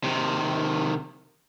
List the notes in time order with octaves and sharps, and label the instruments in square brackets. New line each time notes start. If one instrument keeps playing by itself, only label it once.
[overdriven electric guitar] C3 D#3